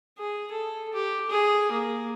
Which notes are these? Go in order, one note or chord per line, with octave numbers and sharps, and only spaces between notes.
G#4
A4
G4
G#4
A#3